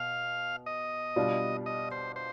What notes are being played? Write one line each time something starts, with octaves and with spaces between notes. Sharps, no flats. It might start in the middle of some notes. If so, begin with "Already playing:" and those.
Already playing: B2 F5
D#5
B2 G3 D4 F4
D#5
C5
C5